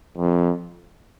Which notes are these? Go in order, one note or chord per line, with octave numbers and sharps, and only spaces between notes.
F2